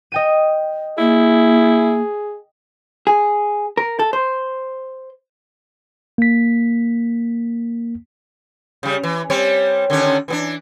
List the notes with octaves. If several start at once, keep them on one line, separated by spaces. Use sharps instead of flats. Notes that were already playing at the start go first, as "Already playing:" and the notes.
D#5 G5 D#7
A#3 E4 G#4
G#4
A#4
A4
C5
A#3 B6
C#3 G3
E3
G3 C4 C#5
D3 D#3 C#4
E3 B3 D4